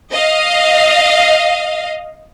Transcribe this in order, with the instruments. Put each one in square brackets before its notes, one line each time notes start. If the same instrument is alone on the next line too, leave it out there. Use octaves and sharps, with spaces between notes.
[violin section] D#5 F5